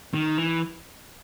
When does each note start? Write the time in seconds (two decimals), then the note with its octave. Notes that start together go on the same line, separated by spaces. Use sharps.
0.14 D#3
0.38 E3